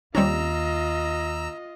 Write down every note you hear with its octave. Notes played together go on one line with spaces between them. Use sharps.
D#2 G3 C4 C#4 F4 D#5 A#5 E6